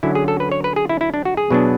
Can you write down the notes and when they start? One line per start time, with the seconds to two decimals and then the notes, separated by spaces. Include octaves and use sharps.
0.03 D3 F#3 C#4 E4
0.15 G#4
0.28 A4
0.40 B4
0.52 C#5
0.64 B4
0.76 G#4
0.89 E4
1.01 E4
1.14 D4
1.25 F#4
1.37 G#4
1.51 B2 F#3 B3 D4